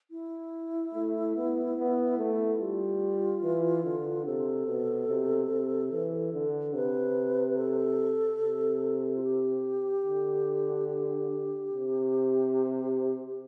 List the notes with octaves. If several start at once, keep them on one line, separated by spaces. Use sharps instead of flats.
E4
A3
B3
B3
A3
G3 F4
E3
D3
C3 A4
B2
C3
C3
E3
D3
C3 B4
A4
C3
F4
G4
D3
G4
C3